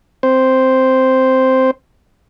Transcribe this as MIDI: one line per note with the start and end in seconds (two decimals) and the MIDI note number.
0.23 1.71 60
0.23 1.71 72